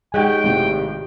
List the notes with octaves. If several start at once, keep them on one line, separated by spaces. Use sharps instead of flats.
G#3 D#4 G4 C#5 F#5 G5
G#1 A2 C3